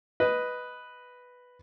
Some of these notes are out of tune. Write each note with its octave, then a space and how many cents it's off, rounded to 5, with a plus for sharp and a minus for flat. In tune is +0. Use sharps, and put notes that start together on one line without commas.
B4 +0 D#5 +0